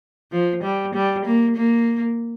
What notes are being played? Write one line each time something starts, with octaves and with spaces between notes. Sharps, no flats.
F3
G3
G3
A#3
A#3